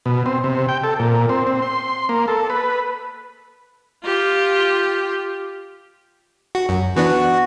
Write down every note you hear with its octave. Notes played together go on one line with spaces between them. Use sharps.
B2
C4
C3
G5
A4
A#2
C4
C4
C6
A#3
A4
B4
F4 G4
F#4
F#2
E3 B3 D4 F#4